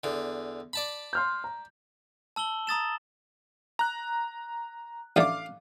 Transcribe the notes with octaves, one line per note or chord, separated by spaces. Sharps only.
E2 D3
D5 A5 B5
C6 F6 G6
A#5
A5 E6 F#7 G7
A#5 D#6 A6 E7
A#5 F#6
A1 D3 A3 F5 D6